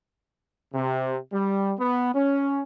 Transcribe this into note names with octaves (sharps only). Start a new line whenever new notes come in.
C3
G3
B3
C#4